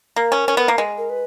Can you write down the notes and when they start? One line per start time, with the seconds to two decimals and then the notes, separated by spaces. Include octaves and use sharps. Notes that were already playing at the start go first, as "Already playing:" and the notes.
0.16 A#3 A#4
0.32 C#4
0.48 C#4
0.57 B3
0.68 A#3
0.78 G#3
0.98 A#4
1.09 B4